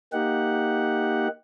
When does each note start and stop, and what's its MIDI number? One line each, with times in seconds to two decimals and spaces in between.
0.13 1.28 58
0.13 1.28 63
0.13 1.28 67
0.13 1.28 78